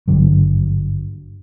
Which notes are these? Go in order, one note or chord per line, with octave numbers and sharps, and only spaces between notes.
G#1 G2 D3 F#3